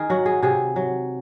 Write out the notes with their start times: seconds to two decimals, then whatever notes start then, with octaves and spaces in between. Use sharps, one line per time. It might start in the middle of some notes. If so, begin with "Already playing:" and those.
Already playing: D#3 G#4 A#4
0.10 F#3 F#4
0.26 G#4
0.42 C3 G#4
0.76 F#3